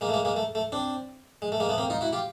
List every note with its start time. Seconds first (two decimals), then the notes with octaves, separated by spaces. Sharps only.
0.01 G#3 A#3
0.09 A3
0.14 G#3 A#3
0.25 G#3 A#3
0.36 A3
0.55 A3
0.72 C4 D4
1.42 G#3
1.52 A3
1.60 G#3 A#3
1.69 A3 B3
1.78 A#3 C4
1.90 D#4 F4
2.01 E4 F#4
2.13 F4 G4